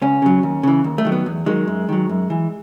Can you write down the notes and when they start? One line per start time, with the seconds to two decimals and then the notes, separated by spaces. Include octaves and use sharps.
0.02 C#2 C#4
0.22 C#3 F#3
0.43 D#2
0.63 C#3 E3
0.84 D#2
0.98 A3
1.05 D#3 F#3
1.12 B3
1.26 E2
1.46 D#3 F#3 G#3
1.67 F#2
1.89 D#3 F#3
2.09 F#2
2.30 E3